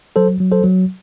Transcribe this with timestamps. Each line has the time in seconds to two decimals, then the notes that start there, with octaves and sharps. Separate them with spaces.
0.16 F#3 A4 C5
0.40 F#3
0.52 A4 C5
0.64 F#3